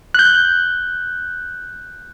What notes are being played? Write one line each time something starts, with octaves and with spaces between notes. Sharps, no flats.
F#6 G6